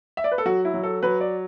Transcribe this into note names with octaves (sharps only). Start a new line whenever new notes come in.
E5
D5
B4
A4
F#3 F#4
E4
F#3
A4
F#3 B4
D5